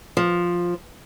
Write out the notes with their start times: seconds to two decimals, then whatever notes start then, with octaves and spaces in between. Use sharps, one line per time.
0.17 F3